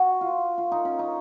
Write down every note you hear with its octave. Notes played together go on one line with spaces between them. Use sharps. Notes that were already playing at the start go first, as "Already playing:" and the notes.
Already playing: F#4
F4
F4
D#4
C#4
D#4